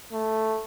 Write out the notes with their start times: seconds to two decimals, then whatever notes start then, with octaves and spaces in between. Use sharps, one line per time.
0.12 A3